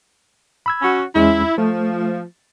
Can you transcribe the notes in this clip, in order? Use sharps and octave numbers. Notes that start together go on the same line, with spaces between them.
B5 E6 G#6
C#4 F#4
E2 G#3 C#4 E4
F3 A3